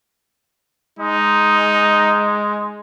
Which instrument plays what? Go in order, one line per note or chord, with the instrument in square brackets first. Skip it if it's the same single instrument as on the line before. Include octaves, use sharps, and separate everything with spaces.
[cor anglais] G#3 [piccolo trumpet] D#4